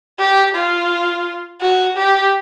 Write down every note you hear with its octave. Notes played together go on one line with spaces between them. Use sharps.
G4
F4
F#4
G4